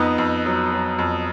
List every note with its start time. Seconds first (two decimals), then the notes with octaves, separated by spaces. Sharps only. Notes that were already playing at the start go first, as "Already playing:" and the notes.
Already playing: F2 B3 D#4
0.18 F2
0.46 F#3
0.72 F#3
0.99 F2